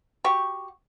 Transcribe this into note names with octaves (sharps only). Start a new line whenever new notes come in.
F#4 G4 C#6